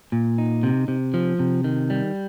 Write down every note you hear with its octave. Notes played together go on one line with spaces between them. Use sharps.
A#2
D#4
C3
C3
F3
C3
D#3
G3